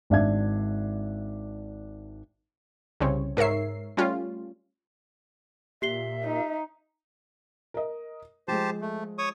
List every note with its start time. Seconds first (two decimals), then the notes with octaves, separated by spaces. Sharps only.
0.10 G#1 D4 E5 G#6
3.00 C2 C#3 C4 C#5
3.37 G#2 A#4 C#5 E5 C7
3.97 G3 A3 C#4 F4
5.82 A#2 G4 E5 C7 G7
6.24 D#4
7.74 A#4 D#5
8.48 F3 G#3 G4 C5 A5
8.81 A3
9.18 C#5 C#6 D#6